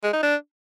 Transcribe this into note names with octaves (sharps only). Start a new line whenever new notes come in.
G#3
D#4
D4